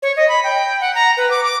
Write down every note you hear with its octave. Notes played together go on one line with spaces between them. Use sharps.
C#5
D#5
B5
G5
F#5
A#5
B4
D6
D6